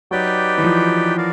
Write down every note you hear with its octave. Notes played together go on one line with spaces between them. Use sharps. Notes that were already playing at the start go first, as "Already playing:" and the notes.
F#3 D#4 G4 B4 D5 G5
E3
F3
F#4 A#4 D5 F5